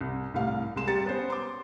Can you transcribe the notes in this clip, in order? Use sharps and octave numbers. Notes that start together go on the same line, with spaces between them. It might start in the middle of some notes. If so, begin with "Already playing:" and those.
C2
C2 A2 G3 F5
C2 G#3 C6 E7
G3 G4 A#5 A6 C#7
B3 C#4 C5
C6 D6